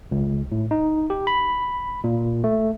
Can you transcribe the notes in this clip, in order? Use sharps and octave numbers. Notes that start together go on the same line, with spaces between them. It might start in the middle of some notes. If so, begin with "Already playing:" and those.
C#2
A2
D#4
G4
B5
A#2
A3